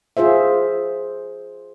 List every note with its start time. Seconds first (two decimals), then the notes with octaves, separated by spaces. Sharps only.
0.17 F4 G#4 C5 E5